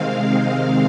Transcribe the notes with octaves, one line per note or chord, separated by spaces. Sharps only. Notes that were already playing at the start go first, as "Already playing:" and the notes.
Already playing: C3 D#3 G#3 C4 F5
F5